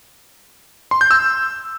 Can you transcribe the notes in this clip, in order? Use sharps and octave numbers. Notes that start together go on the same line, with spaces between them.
C6
G6
E6